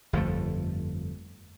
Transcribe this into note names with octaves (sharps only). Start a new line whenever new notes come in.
G1 F2 F3 A3